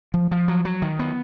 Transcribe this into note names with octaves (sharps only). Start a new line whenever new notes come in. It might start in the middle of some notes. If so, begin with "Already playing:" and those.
F3
F3
F#3
F#3
D#3
B3